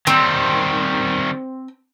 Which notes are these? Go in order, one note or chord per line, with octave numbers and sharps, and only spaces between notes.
D#3 G3 C4